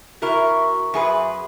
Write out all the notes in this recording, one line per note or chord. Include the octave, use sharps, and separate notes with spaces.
C3 E4 F#4 A#4 C#6
F#2 G#4 B4 E5 C6